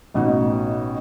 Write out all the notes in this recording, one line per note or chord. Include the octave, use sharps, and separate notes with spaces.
A1 B2 D#4